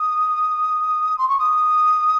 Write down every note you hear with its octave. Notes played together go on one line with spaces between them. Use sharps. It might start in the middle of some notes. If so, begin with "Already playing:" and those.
Already playing: D#6
C6
C#6
D#6